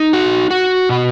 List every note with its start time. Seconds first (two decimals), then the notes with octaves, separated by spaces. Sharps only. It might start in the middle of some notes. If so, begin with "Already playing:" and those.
Already playing: D#4
0.13 F#4
0.51 F#4
0.89 B2